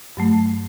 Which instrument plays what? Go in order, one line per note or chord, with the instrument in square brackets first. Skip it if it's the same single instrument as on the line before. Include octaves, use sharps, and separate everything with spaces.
[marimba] G2 F#3 A3